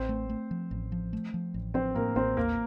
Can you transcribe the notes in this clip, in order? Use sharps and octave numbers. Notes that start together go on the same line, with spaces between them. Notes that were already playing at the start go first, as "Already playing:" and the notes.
Already playing: A1 C4 C5
A3
A3
F3
A1
F3
A3
F3
A1
F3 C4 C5
A2 A#3 A#4
A1 C4 C5
D#2 A#3 A#4